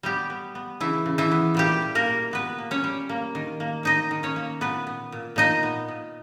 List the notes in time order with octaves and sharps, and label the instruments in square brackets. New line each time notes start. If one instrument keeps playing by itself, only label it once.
[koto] G3 B3 G4
B3
B3
C#3 E3 E4
C#3
E3 E4
B3
A#2 G3 G4
A#2
A#3 A#4
A#2
A#2 B3 B4
A#3
C#4 C#5
G3
A#3
D#3
A#3
D#3 D#4 D#5
D#3
C#4 C#5
A#3
A#2 B3 B4
B3
A#2
A#2 D#4 D#5
B3
A#2